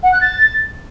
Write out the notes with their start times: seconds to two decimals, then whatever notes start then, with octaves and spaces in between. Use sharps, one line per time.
0.03 F#5
0.12 F#6
0.21 A6